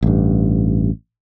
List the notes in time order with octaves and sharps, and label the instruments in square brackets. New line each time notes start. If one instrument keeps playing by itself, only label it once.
[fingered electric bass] A1 G2